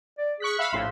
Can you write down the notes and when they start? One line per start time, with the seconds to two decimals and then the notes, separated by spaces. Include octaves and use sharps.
0.18 D5
0.40 G#4 C#6 F#6 B6
0.59 E5 F5 B5 E6
0.73 A#1 A2 C6